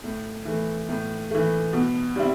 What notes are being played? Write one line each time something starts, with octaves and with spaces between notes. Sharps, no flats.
A2
E3 A3
A2
E3 A3
B2
G3 C4 E4